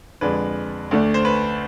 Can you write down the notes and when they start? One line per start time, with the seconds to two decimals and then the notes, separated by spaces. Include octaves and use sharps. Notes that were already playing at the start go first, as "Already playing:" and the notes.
0.21 F2 D3 G#3 D4 B4
0.91 D2 D3 A3 D4
1.14 C5
1.25 B4